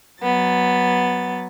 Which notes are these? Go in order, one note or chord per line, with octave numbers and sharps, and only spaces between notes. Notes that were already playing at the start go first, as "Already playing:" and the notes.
F#3 B3 A6